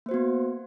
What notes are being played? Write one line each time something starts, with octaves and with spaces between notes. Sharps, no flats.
A#3 B3 F#4 C5